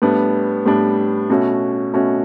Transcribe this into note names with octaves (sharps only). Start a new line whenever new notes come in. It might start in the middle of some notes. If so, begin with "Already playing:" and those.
A2 G3 B3 D4
A2 G3 B3 D4
B2 A3 C#4 F#4
B2 A3 C#4 F#4